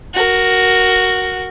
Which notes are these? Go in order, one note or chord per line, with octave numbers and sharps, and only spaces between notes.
F#4 A#4